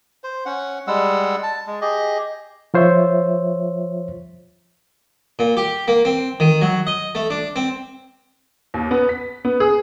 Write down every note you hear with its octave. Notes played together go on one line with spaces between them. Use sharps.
C5
C#4 F#5
G3 G#3 F#5 E6
A5
G#3
G4 G#4 D#5
F3 F4 C5 C#5 E5
A#2
G4
A#3
C4
D#3
F#3
D#5
A3
D4
C4
D#2
B3
B6
B3
G#4